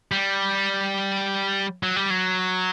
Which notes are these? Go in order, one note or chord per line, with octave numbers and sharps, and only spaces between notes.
G3
F#3
G3
F#3